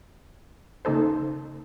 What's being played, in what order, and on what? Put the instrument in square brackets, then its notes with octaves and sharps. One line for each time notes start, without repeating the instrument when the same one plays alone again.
[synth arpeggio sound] C#3 A#3 D#4 A4 C5